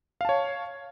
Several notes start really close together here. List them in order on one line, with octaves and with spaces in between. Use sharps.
F5 A5 C#5